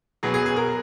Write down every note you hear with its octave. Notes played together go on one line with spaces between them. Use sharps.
B2 F#3 B3 G#4
G#4
G#4
A#4